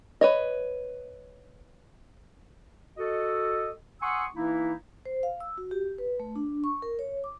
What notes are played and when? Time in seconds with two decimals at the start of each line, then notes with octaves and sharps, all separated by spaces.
0.21 B4 C#5 D#5
2.97 F#4 A4 D#5
4.01 F#5 G#5 C6 C#6 D#6 E6
4.35 E3 A#3 D#4 E4
5.05 C5
5.23 F5
5.40 E6
5.58 F#4
5.71 G4
5.98 B4
6.20 A3
6.36 D4
6.64 C#6
6.82 A#4
6.99 C#5
7.24 D6